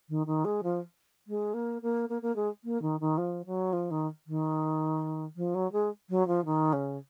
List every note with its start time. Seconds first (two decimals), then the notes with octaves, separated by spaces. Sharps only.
0.09 D#3
0.26 D#3
0.44 G#3
0.63 F3
1.27 G#3
1.53 A#3
1.82 A#3
2.09 A#3
2.22 A#3
2.36 G#3
2.63 A#3
2.81 D#3
3.00 D#3
3.17 F3
3.45 F#3
3.72 F3
3.90 D#3
4.26 D#3
5.36 F3
5.54 F#3
5.72 G#3
6.09 F#3
6.27 F3
6.45 D#3
6.72 C#3